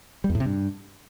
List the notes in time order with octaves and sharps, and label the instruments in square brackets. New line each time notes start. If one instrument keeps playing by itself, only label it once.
[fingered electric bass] G3
E2
A2
C3
G2